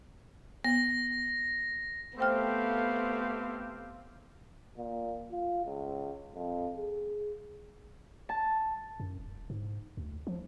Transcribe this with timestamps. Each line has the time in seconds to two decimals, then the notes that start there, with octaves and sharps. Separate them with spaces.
0.64 B3 A#6
2.19 A3 B3 C4 G4 C5 F5 G5 F6
4.77 A#2
5.31 F4
5.65 C#2
6.35 F2
6.77 G#4
8.29 A5
9.00 F#2
9.19 D#1
9.50 G#2
9.97 D2
10.27 F3